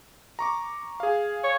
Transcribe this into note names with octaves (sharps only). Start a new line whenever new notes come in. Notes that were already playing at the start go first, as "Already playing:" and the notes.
A#5 C#6 D6
G#4 F5
C#5